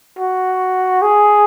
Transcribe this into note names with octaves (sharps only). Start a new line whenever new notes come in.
F#4
G#4